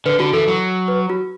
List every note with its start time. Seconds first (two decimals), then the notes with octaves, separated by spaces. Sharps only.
0.06 D3 B4
0.20 D3 F#4
0.33 E3 A4
0.48 F#3
0.88 B4
1.10 F#4